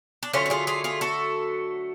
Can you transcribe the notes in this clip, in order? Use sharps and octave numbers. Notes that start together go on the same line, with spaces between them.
D4
D3 F#3 A3 C#4 F4
F#4
F4 G#4
F4 G#4
F4 G#4
F#4 A4